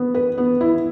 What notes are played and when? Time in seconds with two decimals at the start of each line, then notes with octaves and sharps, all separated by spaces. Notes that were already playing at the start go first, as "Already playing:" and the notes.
Already playing: B3
0.14 B4
0.38 B3
0.61 E4